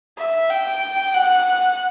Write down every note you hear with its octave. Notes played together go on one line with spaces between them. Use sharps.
E5
G5
F#5